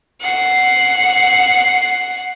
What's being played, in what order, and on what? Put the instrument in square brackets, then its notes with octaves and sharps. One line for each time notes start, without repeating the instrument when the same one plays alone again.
[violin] F#5 C7